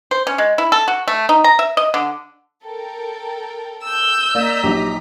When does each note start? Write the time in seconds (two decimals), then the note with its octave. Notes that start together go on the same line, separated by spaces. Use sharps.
0.11 C5
0.27 C#4
0.38 G#3
0.58 E4
0.72 A4
0.88 F#4
1.08 A3
1.29 D#4
1.44 A#5
1.59 E5
1.77 D#5
1.94 D3
2.63 A4 A#4 G5
3.84 E6 G6
4.35 A#3 D5 D#5 A#5 B6
4.63 A#1 F#3 D#4 G4